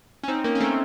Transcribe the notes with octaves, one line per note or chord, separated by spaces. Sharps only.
C#4
C4 D#4
A#3 C#4
C#4
A3 C4